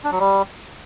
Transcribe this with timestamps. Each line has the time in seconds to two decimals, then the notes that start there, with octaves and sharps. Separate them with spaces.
0.04 D4
0.12 F#3
0.19 G3